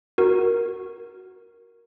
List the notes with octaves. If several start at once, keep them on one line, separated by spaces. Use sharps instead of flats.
F#4 A#4